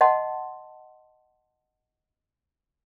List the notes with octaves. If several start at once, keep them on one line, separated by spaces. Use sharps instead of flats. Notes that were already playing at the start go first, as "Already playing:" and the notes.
D#5 F#5 A5 C6